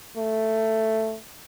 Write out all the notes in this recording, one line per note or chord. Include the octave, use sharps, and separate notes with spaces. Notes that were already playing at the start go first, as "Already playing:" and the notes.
A3